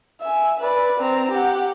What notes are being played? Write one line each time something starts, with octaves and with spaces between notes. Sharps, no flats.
E5 G#5
B4 D5
C4 A#5
G4 F#5